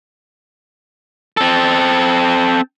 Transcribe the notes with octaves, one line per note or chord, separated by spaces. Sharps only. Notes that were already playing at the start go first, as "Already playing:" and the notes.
C4 A4